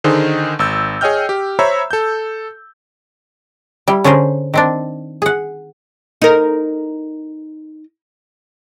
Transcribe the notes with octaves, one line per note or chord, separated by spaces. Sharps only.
D3 D#3 D#4 G#4 C5
G#1 E6 G6
G#4 C#5 D#5 G5 F6 G6
G4
C5 C#5 E5 A#5 B5 E6
A4 G6
G3 E4
D3 C#4 G#4 A#4 C5
D#3 C4 D4
G#4 F#5
D#4 A#4